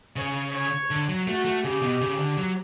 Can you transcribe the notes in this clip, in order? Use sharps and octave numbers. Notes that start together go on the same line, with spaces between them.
C#3 C#5
C#5
D3
F#3
A3 F#4
A3
C#3 G4
B2
C#3
D3
F#3